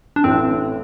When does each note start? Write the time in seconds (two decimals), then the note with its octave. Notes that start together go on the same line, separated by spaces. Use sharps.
0.16 D4
0.24 A1 A2 A3 C4